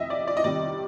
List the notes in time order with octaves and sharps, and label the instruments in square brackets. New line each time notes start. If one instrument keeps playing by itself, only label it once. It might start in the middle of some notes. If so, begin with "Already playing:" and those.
Already playing: [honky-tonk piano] F2 C3 D#5 E5
D5
D5
D#5
C3 D#3 G3 D5